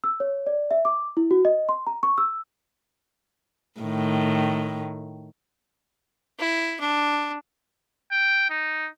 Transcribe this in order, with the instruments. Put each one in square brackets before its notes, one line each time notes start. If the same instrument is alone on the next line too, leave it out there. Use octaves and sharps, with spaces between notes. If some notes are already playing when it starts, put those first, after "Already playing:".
[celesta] E6
C#5
D5
E5
D6
E4
F#4
D#5
C6
A#5
C#6
E6
[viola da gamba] A2 D#3
[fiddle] E4
D4
[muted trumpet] G5
D#4